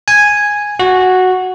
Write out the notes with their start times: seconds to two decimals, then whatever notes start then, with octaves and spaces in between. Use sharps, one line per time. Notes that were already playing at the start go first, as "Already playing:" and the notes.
0.08 G#5
0.79 F#4